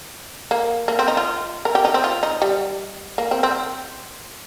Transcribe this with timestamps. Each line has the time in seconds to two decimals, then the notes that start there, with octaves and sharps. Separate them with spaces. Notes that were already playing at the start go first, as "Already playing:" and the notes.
0.51 A#3
0.88 A#3
0.99 C4
1.08 D#4
1.17 F4
1.65 A#4
1.75 G4
1.85 D#4
1.94 C4
2.04 F4
2.23 D#4
2.42 G3
3.18 A#3
3.31 C4
3.43 C4